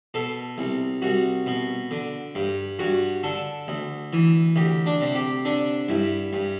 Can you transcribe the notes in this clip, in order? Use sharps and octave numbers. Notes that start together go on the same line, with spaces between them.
B2 A4
C2
C2 F#4
B2
D3
G2
G2 F#4
D3 A4
D2
E3
D2 G4
D4
C3
G4
D3 D4
G2 E4
G2